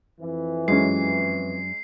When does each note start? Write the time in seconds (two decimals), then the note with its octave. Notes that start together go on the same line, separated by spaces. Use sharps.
0.21 F2 E3
0.68 F#2 G#3 C#4 C7